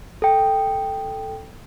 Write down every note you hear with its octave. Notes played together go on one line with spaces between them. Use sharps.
A4 G5